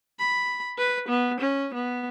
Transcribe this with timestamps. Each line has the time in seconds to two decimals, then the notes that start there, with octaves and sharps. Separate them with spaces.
0.19 B5
0.78 B4
1.09 B3
1.40 C#4
1.74 B3